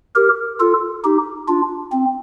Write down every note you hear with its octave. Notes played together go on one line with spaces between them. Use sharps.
G4 A#4
F4 A4
D#4 G4
D4 F4
C4